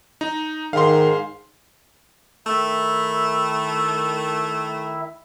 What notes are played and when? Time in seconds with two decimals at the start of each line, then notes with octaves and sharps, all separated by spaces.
0.21 D#4
0.73 G#2 D#3 F5 C6
2.46 D#3 A3 E4 E5